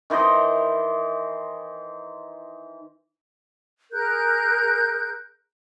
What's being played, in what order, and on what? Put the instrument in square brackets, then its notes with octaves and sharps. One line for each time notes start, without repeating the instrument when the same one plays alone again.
[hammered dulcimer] D#3 E3 C5 D#5
[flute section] G#4 A#4 F#6 G6